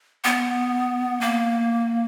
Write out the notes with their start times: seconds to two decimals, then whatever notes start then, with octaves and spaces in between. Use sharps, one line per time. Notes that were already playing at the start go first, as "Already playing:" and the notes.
0.24 B3
1.21 A#3